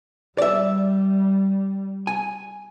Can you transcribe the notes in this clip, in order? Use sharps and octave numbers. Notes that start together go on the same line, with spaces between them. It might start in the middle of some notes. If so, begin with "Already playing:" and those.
G3 D5 E5
G#5